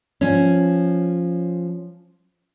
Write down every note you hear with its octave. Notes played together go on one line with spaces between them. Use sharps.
F3 C#4